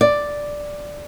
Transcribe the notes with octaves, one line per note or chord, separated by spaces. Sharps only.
D5